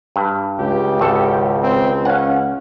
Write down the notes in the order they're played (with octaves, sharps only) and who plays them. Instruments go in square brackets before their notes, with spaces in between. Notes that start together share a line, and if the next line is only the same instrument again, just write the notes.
[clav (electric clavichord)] G2
[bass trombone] C#2 [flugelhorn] G4
[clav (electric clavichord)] G#1 A4
[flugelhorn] C4
[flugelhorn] C#4 [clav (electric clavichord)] F5 F#5